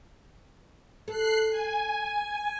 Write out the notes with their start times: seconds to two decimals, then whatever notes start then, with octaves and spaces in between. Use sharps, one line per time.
1.08 A4 F#6 C7
1.50 G#5